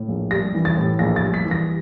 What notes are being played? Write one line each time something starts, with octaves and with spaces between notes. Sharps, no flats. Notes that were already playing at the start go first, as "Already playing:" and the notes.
Already playing: A2
A#1
G3 A#6
E3
A6
A2
A#1 A#6
A6
G3
B6
E3
A#6